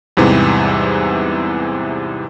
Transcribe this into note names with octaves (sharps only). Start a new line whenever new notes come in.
E2 G#2 C3 E3 G3